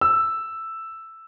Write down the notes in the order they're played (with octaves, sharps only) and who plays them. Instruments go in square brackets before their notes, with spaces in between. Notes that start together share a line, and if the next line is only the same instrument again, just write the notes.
[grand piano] E6